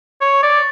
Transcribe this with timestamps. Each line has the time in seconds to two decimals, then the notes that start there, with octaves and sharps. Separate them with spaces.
0.21 C#5
0.43 D5